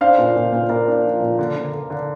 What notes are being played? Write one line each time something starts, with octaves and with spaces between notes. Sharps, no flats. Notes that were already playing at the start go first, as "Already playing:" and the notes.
D4 C5 F5
A#2
A#2
A#2
A#2 A#4 D5
D4
F3
A#2
D3
D3
D3
D3